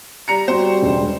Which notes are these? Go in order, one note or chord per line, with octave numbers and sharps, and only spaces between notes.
G3 A#5 C#7
G3 C4 F#4 G4 C5
E1 C#2